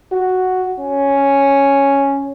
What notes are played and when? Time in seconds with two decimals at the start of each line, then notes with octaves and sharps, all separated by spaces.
0.11 F#4
0.80 C#4